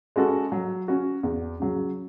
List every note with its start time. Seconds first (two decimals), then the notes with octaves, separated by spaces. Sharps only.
0.16 G#3 C#4 F#4 A4
0.52 F#3
0.88 C#4 F#4
1.23 E2
1.60 C#3 F#3